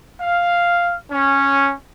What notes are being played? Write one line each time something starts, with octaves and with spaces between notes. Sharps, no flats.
F5
C#4